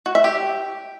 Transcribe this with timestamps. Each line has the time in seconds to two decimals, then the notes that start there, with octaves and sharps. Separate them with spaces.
0.06 F#4
0.15 E5
0.24 G4